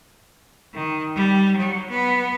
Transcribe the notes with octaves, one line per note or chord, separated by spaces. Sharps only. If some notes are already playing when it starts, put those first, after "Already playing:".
D#3
G3
F#3
B3